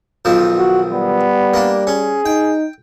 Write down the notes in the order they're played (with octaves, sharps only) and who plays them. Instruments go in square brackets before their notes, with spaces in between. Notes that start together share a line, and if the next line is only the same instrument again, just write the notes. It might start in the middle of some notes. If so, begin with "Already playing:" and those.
[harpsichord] B1 D#3 F3
[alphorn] F#4
[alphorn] G3 [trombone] B3
[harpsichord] A#3 D4
[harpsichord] C#4 [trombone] G#4
[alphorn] D#4 [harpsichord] G5